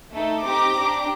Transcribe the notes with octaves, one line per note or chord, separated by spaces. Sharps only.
A3 D#4 A4
C4 D#4 G4 A#5 D6
D4 G4